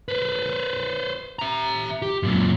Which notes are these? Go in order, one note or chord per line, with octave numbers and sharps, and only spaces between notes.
B4 C5
E5 A#5
G4
F#2 A#2